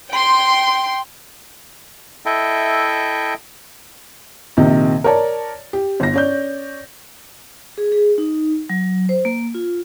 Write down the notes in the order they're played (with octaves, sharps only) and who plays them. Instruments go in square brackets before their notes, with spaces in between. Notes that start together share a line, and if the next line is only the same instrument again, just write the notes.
[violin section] G5 C6
[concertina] E4 A4 D#5 E5 G5
[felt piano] A#1 C3 D#3
A#4 C#5 D5 A5
G4
G1 A#6
C#4 D5 G6
[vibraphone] G#4
G#4
D#4
F#3
C5
A#3
F4